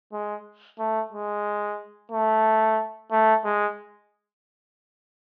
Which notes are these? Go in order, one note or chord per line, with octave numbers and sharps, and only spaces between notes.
G#3
A3
G#3
A3
A3
G#3